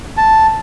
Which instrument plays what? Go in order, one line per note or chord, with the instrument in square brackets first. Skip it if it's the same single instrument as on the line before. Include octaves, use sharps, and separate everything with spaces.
[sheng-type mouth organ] A5